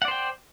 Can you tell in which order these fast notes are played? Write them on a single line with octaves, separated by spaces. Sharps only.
F#5 D5 C5 G5